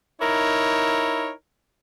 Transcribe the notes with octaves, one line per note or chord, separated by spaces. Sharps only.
D#4 E4 A#4 C#5